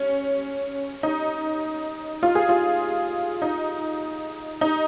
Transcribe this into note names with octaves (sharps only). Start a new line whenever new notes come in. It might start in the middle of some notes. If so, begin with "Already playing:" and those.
Already playing: C#4
D#4
F4
G#4
F4
D#4
D#4